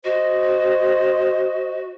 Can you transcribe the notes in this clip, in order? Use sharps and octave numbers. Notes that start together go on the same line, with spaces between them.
F#4 C5 D#5